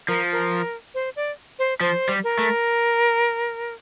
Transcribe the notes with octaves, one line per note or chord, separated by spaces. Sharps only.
F3 A#4
A#4
C5
D5
C5
F3 C5
G3
A#4
A3